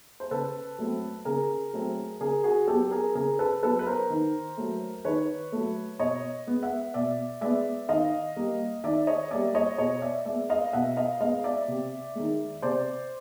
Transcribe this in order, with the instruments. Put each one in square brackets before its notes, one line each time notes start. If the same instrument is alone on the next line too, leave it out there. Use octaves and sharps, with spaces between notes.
[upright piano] C5
C#3 A4 B4
F#3 A3 C4
C#3 G#4 A#4
F#3 A3 C4
C#3 G#4 A#4
F#4 G#4
F#3 B3 G4 A4
G#4 A#4
C#3 G#4 A#4
A4 B4
F#3 B3 A4 B4
B4
A#4 C5
D#3
F#3 A3
D#3 B4 C#5
F#3 A3
B2 C#5 D#5
G#3 B3
E5 F#5
B2 D5 E5
G#3 B3 D5 E5
D#3 D#5 F5
G3 A#3
D#3 D5 E5
C#5 D#5
G3 A#3 D5 E5
C#5 D#5
B2 C#5 D#5
D5 E5
G#3 B3 D5 E5
D#5 F5
B2 E5 F#5
D#5 F5
G#3 B3 D#5 F5
D5 E5
C3
D#3 G#3
C3 C5 D5